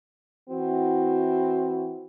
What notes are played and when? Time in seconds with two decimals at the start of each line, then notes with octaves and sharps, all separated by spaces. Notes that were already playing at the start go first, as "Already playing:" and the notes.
0.50 E3 C4 E4 F#4